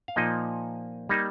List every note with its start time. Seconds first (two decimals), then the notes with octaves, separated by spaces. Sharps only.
0.08 F5
0.16 A#2 F3 A#3 D#4 D#5
1.09 G3 A#3 D#4